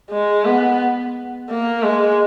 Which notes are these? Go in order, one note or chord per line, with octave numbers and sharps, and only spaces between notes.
G#3
B3
A#3
G#3